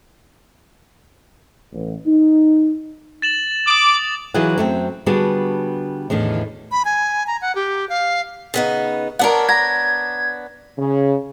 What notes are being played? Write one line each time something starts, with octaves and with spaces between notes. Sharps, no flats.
A1
D#4
A6 E7 F#7
D6 D#6 F#7
E3 F#3 F4 G#4 B4 F#5
F#2 A3 C4
D3 G3 B3 F#4 G#4 A5
E2 A2 D3 D#3
B5
G#5
A#5
F#5
G4
F5
C#3 B3 D#4
B3 D4 A#4 C#5 F#5
A#5 G#6
C#3